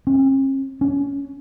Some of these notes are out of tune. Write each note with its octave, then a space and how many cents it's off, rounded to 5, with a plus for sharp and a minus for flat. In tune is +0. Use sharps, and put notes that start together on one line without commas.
C#4 -45
C#4 +20